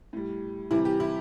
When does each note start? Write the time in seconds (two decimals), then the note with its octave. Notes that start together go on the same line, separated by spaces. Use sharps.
0.13 A2 G3
0.71 C3 E3 G3 E4
0.85 G4
1.00 E4